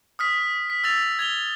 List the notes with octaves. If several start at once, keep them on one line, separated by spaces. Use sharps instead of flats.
D#6 F6 B6
B6
E6 A6 F7
G#6 F7 G7